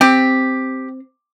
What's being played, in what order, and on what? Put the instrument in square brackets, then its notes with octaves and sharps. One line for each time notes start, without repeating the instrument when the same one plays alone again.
[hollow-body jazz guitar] C4 [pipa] G4